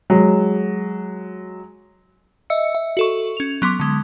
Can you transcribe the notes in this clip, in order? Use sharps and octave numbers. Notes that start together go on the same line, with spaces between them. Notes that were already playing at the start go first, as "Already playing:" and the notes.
F#3 G#3
D#5 E5 E6 C#7
E5
F#4 A4 C#6
C#4 F7
F#3 B3 C6 D6
D3 G#3